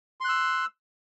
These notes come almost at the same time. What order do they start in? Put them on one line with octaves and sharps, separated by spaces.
C6 F#6 E6